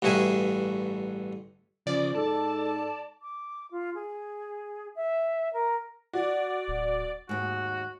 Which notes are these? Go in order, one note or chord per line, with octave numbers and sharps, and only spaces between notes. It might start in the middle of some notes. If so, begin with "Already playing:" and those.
A1 G2 F#4 G#4 E5 G#5
C#3 F3 D5
G#2 A4 A5
D6
F4
G#4
E5
A#4
F#4 D5
D1
D#2 G#2 F#4